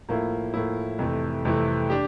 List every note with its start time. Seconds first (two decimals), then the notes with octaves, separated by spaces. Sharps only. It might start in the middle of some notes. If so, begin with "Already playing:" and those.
0.09 A2 F3 A#3 E4
0.54 A2 F3 A#3 E4
0.99 F2 C3 E3 A3
1.45 F2 C3 E3 A3
1.90 D4 G4